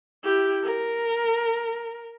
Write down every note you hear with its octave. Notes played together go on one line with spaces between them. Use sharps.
E4 G4
A#4